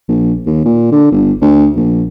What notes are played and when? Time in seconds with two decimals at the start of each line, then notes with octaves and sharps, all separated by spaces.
0.09 A#1
0.46 D#2
0.65 A#2
0.92 D3
1.12 G1
1.41 D2
1.76 A#1